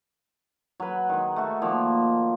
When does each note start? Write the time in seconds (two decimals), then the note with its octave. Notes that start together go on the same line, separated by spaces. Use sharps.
0.80 F#3 B4
1.09 D#3 G#3
1.36 A3 F#4
1.62 A#2 D#3 F3 A#3